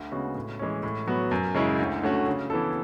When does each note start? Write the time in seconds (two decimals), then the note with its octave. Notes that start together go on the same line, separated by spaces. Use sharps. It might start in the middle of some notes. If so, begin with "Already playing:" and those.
Already playing: D2
0.12 C#3 G#3 B3 F#4
0.35 A2
0.59 E3 G#3 C#4
0.83 A2
1.07 F#3 B3 F#4
1.31 F#2
1.55 C#3 G#3 C#4 E4
1.79 D2
2.03 D3 A3 C#4 F#4
2.26 C#3
2.50 E3 B3 E4 A4